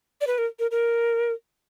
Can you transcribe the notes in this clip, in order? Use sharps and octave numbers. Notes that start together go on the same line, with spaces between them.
D5
B4
A#4
A#4
A#4